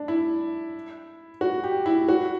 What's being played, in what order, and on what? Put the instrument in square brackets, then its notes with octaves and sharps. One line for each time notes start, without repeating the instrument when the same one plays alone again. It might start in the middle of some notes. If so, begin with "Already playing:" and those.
Already playing: [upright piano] D4
E4
F#4
G4
E4
F#4